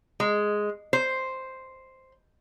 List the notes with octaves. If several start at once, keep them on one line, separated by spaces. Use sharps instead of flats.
G#3
C5